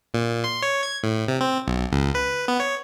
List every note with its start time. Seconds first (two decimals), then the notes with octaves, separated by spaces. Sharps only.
0.14 A#2
0.44 C6
0.62 C#5
0.83 G#6
1.03 A2
1.28 C3
1.41 C4
1.68 B1
1.92 C#2
2.15 B4
2.48 B3
2.60 C#5